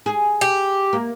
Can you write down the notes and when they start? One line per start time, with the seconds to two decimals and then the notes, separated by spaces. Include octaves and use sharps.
0.06 G#4
0.41 G4
0.93 A#3